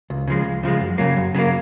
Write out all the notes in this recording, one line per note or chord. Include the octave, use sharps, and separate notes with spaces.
C#2
C#3 F3 G#3
C#2
C#3 F3 G#3
F#2
C#3 F#3 A#3
F#2
C#3 F#3 A#3